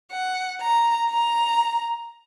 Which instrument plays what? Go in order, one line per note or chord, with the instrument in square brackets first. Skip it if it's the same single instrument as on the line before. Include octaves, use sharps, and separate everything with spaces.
[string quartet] F#5
A#5
A#5